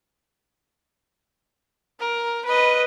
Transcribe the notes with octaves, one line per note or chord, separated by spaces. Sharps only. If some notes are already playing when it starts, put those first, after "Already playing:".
A#4
B4 D#5